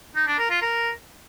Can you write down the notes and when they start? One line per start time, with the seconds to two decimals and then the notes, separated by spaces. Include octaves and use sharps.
0.16 D#4
0.27 D4
0.39 A#4
0.50 F4
0.62 A#4